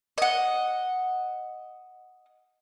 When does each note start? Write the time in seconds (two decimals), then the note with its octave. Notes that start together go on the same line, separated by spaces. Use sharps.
0.18 D#5 F#5